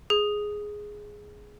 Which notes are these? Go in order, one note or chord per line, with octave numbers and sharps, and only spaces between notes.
G#4